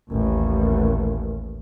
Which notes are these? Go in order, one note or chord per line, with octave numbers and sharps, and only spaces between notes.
A1 D#2